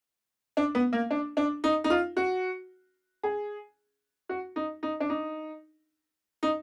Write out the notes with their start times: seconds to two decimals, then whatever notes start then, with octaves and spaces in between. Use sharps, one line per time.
0.57 D4
0.75 B3
0.93 A#3
1.11 D4
1.37 D4
1.64 D#4
1.84 D#4
1.90 F4
2.17 F#4
3.23 G#4
4.29 F#4
4.56 D#4
4.83 D#4
5.00 D4
5.10 D#4
6.43 D#4